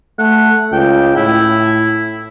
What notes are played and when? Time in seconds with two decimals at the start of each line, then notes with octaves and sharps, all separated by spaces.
0.18 A3 F#5
0.72 C#2 G5
1.16 A2 E4